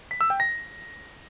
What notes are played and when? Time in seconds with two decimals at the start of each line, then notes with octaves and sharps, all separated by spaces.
0.11 B6
0.21 E6
0.30 G5
0.40 A#6